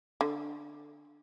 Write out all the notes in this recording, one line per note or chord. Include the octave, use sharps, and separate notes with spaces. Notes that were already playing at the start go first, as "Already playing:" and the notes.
D3